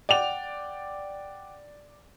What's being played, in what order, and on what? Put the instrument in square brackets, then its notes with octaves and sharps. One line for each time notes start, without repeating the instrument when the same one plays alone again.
[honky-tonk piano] D5 F7 [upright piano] F#5 G5 D6